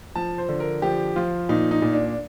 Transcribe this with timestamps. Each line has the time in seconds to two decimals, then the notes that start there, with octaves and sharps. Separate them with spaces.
0.15 F3 A5
0.38 C5
0.49 D3
0.60 A#4
0.82 F3 G4
1.16 F3 F4
1.49 A#2 D#4
1.71 D#4
1.82 A#2
1.93 D4